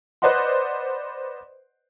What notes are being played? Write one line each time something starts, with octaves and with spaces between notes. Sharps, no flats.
B4 C5 D5 D#5 F#5 C6